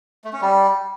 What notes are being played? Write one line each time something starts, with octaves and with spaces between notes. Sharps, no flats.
A3
C#4
G3